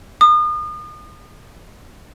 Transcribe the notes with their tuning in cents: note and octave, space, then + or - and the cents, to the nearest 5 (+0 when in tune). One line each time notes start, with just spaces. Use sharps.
D#6 -35